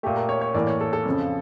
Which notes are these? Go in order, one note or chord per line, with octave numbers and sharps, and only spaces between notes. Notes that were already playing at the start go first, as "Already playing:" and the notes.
A#2 A3 G4
A#4
C#5
C#5
A2 E3 A#3 D5
C#5
A4
A4
F2 C#3 F3